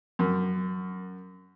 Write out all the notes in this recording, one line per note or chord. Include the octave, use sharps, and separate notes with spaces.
F#2